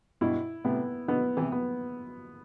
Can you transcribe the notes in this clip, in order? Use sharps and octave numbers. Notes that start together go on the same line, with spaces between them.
G2 B2 E4
A2 C3 B3
B2 D3 B3
C3 E3
B3